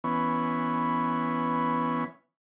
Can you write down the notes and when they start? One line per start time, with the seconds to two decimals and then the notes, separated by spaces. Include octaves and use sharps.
0.04 E3 B3 C#4